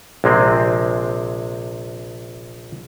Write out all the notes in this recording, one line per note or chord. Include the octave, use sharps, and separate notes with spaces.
A#1 C3 G#3 C4